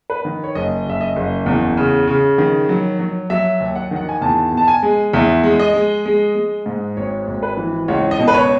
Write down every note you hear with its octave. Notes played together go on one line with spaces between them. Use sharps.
B4
D#3
C#5
F#1 D#5
F#1 E5
D#5
F#1
E2
C#3
C#3
D#3
F#3
F#3
F#3 E5
D#2
F#5
D#3 F#5
G#5
E2 A5
B2
A5
G#5
G#3
E2 E5
G#3
D#5
G#3
G#3
G#3
G#2
G#1 C#5
G#1
B4
E3
C#2 C#5
D#5
B2
B4
C#5